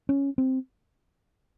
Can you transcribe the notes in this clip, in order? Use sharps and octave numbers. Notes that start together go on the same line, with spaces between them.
C#4
C4